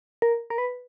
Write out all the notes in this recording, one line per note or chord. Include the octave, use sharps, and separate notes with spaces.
A#4
A#4
B4